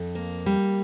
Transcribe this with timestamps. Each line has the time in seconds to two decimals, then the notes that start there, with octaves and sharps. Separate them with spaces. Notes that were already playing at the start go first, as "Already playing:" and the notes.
Already playing: F2
0.15 A#3
0.46 G3